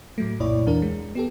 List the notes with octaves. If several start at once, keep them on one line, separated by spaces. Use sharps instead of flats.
A2 F#3 A3
C2 F#2 A#2 E4 C#5 D5
E2 E3 D4 A#4
G#3
B3 G4 A4